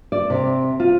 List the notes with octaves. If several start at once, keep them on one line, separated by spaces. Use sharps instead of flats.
D5
C3
F4